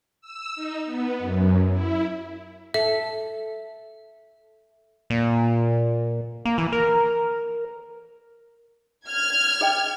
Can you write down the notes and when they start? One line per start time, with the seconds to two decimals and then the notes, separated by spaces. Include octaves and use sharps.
0.21 E6
0.55 D#4
0.85 B3
1.18 F#2
1.71 E4
2.74 A4 E5
5.10 A#2
6.45 A#3
6.58 E3
6.72 A#4
9.07 F6 G#6
9.61 G#4 D#5 G5